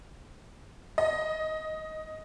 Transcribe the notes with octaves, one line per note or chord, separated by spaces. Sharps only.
D#5